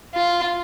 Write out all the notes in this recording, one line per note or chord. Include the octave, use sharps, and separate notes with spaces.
F4